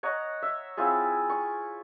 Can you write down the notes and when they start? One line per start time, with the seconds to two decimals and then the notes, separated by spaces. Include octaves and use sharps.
0.03 C#5 D#5 F#5 A#5
0.42 E5
0.77 C4 E4 F4 G#4
1.29 C#6